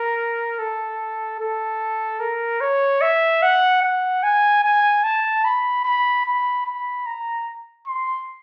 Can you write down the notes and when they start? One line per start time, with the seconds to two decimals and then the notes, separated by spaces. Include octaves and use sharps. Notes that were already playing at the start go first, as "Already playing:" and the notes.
Already playing: A#4
0.59 A4
1.39 A4
2.20 A#4
2.60 C#5
3.01 E5
3.42 F#5
3.82 F#5
4.23 G#5
4.64 G#5
5.04 A5
5.44 B5
5.85 B5
6.25 B5
6.66 B5
7.06 A#5
7.87 C6